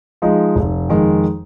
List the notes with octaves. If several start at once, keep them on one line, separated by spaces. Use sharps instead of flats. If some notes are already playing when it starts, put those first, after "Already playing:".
F3 G#3 D#4
F1
F2 D#3 G#3